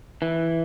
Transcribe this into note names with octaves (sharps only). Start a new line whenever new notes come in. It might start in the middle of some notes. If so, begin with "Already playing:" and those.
E3